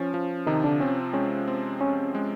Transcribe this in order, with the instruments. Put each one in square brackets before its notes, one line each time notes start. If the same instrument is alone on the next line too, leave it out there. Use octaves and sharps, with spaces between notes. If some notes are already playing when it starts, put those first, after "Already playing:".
Already playing: [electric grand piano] F3 [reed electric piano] C#4
[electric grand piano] F3
[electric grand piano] C3 [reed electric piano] D#3 D#4
[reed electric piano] D3 D4
[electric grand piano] C4 [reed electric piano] C#4
[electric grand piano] G#3 [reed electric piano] C#4
[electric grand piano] C4
[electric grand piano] C4 [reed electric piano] C#4
[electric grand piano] G#3